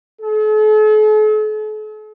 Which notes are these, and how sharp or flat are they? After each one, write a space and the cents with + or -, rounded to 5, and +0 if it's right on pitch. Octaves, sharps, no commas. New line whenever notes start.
A4 -45